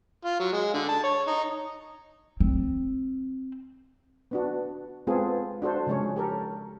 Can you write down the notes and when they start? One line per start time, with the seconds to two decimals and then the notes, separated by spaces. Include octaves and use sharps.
0.25 F4
0.40 F#3
0.53 G#3
0.74 D3
0.88 A5
1.04 C#5
1.27 D#4
2.40 C4
4.31 B3 D4 F#4
5.07 G#3 B3 C4 F4 G#4 A4
5.62 D4 F#4 A4 C5
5.87 C#3 F3 G#3 C#4 C#5
6.16 G4 A4 A#4